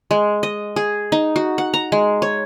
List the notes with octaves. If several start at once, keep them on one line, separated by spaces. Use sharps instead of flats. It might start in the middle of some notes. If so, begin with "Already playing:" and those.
G#3
D#5
G#4
D#4
F#4
F#5
A#5
G#3
C#5